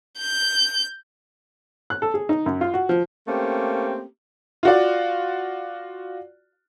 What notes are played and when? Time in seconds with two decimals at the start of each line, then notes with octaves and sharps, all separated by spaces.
0.18 G6
1.90 F#6
2.02 A4
2.14 G#4
2.29 D#4
2.46 F#2
2.61 F4
2.74 F#4
2.89 F3
3.28 A3 A#3 C4 C#4 G4
4.63 F4 F#4 D5